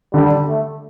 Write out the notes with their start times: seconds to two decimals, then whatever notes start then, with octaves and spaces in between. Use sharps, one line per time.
0.13 D3 G3
0.48 A3